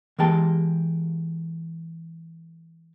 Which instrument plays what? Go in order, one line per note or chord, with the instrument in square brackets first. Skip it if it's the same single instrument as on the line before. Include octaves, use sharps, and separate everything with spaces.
[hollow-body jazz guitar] E3 G#3 A#3 G4 A5